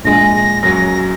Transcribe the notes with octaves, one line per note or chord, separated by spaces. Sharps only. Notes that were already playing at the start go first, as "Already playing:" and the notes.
A#1 G#3 A#6
F#2 F#3 A#6